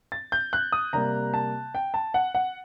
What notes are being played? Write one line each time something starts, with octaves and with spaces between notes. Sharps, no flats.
A6
G6
F#6
D#6
C3 G3 A#3 A#5
A5
G5
A5
F#5
F#5